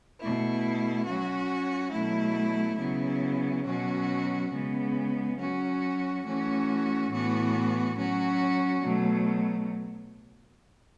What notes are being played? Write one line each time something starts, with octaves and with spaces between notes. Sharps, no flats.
B2 A3 E4
F#3 C#4 F#4
B2 F#3 A3 E4
C#3 F#3 B3 E4
B2 F#3 C#4 F#4
C#3 G#3 B3
F#3 C#4 F#4
E3 A3 C#4 F#4
A2 E3 B3 F#4
F#3 C#4 F#4
B2 F#3 A3